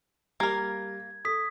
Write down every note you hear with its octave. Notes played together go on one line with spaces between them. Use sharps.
G3 A#3 A#4 G#6
A4 D#6 B6